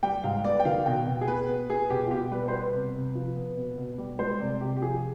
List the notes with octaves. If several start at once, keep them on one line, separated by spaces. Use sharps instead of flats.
G3 G5
G#2 F5
B3 D5
G5
D#3 F5
B2 G5
B2
G#4
B3 B4
B3
B3 G#4
B2 G4
F4
B2 G4
G3 B4
C5
B3 B4
C3
C3
F3
B3
B2
B2
G3
G#3 C5
C3 D5
C3 G4
G4
F3 G#4